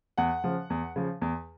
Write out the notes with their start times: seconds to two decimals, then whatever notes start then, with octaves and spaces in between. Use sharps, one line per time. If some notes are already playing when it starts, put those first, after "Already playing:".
0.18 E2 F#5
0.44 C#3 F3
0.70 E2
0.96 C#3 F3
1.22 E2